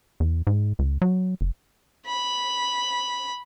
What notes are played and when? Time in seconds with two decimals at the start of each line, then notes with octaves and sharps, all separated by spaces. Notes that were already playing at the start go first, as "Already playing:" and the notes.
0.20 E2
0.47 G#2
0.79 C#2
1.02 F#3
1.41 F#1
2.07 B5